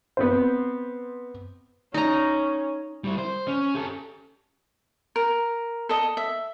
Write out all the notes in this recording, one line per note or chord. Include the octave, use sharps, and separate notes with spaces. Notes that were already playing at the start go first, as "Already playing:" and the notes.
B3 C4 C5
C#4 D#4 A#5
G3 E4
C5
C#4
G4 A4
A#4
A4 D#5
E5